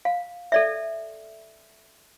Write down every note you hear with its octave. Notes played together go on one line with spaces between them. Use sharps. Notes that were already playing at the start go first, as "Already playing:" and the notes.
F5
A4 D5 E5